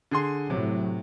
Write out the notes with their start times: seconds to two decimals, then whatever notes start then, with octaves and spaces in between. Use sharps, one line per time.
0.11 D3 G#4 C6
0.50 A2 C3 F#3